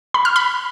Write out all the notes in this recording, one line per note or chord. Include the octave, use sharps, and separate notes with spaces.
B5
F6
B5